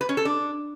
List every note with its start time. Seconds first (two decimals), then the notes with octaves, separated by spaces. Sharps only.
0.01 B4
0.09 C#4
0.17 A4
0.25 D4